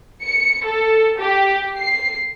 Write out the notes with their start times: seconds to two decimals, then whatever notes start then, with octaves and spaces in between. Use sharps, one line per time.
0.23 C#7
0.65 A4
1.19 G4
1.78 C7